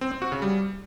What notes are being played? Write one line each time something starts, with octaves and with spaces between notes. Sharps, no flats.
C4
C4
F#4
C#3
G3